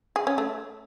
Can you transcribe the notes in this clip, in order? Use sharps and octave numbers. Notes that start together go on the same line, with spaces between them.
G#4
C#4
A3